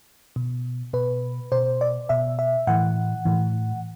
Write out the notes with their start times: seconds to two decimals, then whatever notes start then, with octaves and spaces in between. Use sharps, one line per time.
0.36 B2
0.93 B2 B4
1.52 B2 C5
1.81 D5
2.09 B2 E5
2.39 E5
2.67 A2 E3 F#5
3.25 A2 E3